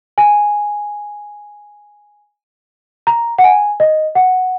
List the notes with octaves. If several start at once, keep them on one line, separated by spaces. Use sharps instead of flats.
G#5
A#5
F#5
G#5
D#5
F#5